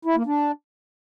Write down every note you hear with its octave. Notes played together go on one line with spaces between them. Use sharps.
E4
A#3
D4